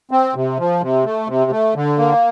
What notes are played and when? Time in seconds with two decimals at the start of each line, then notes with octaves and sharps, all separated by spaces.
0.11 C4
0.35 C3
0.59 F3
0.81 C3
1.05 A3
1.28 C3
1.51 A3
1.75 D3
1.98 A#3